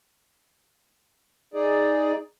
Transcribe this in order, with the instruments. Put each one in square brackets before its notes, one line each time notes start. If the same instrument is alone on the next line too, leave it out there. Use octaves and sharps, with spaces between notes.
[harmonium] D#4 G#4 D5